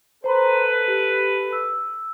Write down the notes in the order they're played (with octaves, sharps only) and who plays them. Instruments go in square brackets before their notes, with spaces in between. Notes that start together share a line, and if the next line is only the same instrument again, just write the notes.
[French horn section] A4 B4 [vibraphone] C5 A#5 C6
[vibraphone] G4
E6